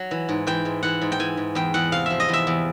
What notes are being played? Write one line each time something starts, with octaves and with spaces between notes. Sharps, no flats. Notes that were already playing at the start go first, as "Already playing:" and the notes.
Already playing: F#3
E3
G#2
E3 G5
G#2
E3 F#5
G#2
G5
E3 G#5
G#2
E2 G5
E2 F#5
C3 F5
F3 E5
D#5
E2 E5
E2